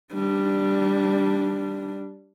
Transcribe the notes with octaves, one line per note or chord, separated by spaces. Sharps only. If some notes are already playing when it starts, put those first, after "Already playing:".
G3 D4